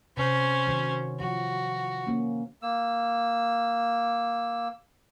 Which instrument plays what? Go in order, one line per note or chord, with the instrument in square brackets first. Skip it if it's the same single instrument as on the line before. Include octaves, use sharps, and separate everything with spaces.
[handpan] C3 [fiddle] C#4 C5
[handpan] D#3 F#3
[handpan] F3 [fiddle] F#4
[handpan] A#3 C#4
[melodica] A#3 E6